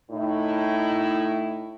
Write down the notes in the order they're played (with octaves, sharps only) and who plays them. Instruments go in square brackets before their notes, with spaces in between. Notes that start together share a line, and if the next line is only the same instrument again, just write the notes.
[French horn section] A2 D#4 E4